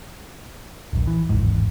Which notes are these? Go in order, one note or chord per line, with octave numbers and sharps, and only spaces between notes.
D#1 A#1
E3
D1 G#1 E2 G#2